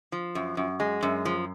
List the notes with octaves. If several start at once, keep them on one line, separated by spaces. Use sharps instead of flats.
F3
F#2
F#2
G#3
F#2
F3